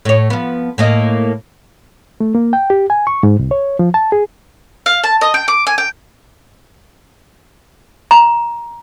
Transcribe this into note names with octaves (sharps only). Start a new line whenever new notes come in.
A2 C#5
F3 B3
A2 A#3 D#5
A3
A#3
G5
G4
G#5
C#6
G#2
C2
C#5
F3
A5
G#4
F5
A5
D#5
G5
D6
G#5
G5
A#5